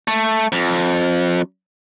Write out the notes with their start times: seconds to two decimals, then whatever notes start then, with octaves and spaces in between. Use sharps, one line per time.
0.08 A3
0.52 F2